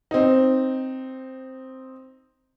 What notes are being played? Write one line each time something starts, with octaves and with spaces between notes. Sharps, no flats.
C4 D#4